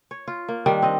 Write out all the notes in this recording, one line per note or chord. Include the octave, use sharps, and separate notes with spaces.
C#5
F4
A#3
D#3 G3 D4
C4 D#5